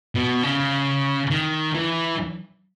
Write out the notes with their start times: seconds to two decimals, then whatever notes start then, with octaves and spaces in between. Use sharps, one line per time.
0.15 B2
0.43 C#3
1.30 D#3
1.75 E3